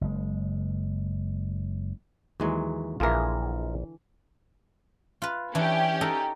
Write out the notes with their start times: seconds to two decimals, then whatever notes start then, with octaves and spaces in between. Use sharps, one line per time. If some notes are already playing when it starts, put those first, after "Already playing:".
0.01 F#1 G#3
2.40 D#2 E3 F#3 G#3
3.00 A#1 D3 E3 F4 G#4 A#4
5.22 F4 B4
5.55 E3 C#4 D4 G4
6.01 D#4 A4 A#4